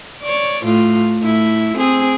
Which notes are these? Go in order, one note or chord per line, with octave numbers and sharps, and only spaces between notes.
C#5 D5
A2 F4
A2 E4
C4 G#4